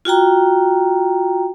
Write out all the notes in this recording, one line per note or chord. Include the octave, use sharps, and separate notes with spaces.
F4 F#4 G5 A#5